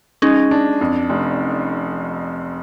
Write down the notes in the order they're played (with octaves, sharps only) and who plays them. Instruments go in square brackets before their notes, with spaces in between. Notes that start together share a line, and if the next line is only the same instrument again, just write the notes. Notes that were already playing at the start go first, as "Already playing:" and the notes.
[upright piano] G#3 [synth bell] C#4 D#4
[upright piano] D4
F2
F1